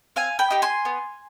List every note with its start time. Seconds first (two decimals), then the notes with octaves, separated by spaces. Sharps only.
0.16 C4 F5 G#5
0.39 G5 B5
0.50 D#4 G4
0.62 G#5 C6
0.85 B3